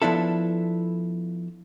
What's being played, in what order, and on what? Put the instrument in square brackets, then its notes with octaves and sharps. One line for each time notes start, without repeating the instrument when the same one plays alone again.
[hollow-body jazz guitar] F3 B3 D4 E4 A4